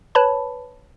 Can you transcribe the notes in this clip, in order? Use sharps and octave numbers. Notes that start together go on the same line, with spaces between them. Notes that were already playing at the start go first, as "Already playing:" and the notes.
B4 C#5 A5 B5